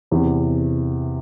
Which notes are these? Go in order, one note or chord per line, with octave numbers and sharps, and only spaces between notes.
E2 C3 E3